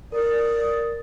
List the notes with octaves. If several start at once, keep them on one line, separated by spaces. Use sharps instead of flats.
A#4 D5 D#6